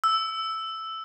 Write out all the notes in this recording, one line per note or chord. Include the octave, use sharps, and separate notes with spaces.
E6